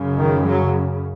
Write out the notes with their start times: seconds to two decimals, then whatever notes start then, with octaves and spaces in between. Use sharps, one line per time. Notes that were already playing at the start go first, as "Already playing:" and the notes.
Already playing: F#2 C#3
0.18 D#3
0.46 F#3